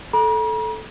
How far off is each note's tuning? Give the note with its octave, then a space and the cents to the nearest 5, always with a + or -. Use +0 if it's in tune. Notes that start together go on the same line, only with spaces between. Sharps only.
A4 -10 A#5 +45